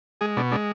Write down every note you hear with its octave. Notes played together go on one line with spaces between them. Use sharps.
G#3 G#4
B2 D4
G#3 D4